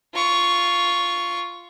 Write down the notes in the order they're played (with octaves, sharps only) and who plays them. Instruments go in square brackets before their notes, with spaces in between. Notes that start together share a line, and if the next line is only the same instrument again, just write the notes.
[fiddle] F4 C#6